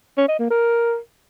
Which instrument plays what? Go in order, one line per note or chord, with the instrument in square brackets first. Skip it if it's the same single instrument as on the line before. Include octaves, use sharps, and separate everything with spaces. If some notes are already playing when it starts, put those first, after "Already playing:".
[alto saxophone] C#4
D#5
A#3
A#4